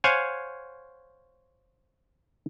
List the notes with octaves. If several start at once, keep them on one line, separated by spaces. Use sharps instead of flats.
C5 C#5 F5 F#5 G#5